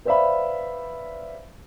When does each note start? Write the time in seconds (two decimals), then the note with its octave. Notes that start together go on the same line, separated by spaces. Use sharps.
0.05 B4 C5 D5 E5 F5 B5